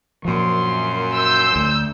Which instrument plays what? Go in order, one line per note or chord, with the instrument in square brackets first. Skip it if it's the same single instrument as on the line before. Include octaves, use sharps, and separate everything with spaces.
[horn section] F#2 C6 [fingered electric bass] A#2 F3
[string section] E6 G6
[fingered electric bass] D2